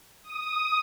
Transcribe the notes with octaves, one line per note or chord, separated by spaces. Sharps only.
D#6